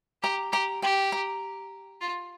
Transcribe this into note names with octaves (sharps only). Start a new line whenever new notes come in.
G4 A#5
G4 A#5
G4 G5
A#5
F4